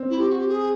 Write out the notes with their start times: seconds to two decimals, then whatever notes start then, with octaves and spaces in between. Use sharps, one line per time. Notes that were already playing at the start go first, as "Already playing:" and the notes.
Already playing: C4
0.10 E4
0.18 G4
0.28 F#4
0.38 G4
0.48 G#4